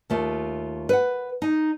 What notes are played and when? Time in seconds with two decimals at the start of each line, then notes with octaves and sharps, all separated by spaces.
0.10 D#2 A3 F4
0.89 B4 F#5
1.42 D#4